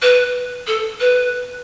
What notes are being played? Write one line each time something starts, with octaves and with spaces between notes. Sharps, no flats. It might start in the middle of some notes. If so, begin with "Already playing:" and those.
B4
A4
B4